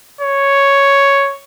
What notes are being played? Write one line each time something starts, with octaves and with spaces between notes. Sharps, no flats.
C#5